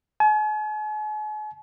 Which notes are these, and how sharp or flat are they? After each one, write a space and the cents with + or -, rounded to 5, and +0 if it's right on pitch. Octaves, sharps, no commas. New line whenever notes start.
G#5 +45